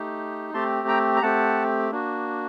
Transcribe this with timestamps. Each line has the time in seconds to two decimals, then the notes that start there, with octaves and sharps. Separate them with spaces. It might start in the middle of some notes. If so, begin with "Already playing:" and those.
Already playing: A3 D#4 G4
0.53 A3 C4 G4 A5 C6
0.88 G5 A#5
1.16 A#5
1.22 A3 C4 G4 F#5 A5
1.91 A#3 D4 F#4